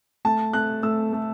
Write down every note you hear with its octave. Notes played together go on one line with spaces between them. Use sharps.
A3 A5
A3 F#6
A3 E6
A3